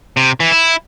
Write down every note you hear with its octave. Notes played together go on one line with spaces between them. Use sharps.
C3
E3
E4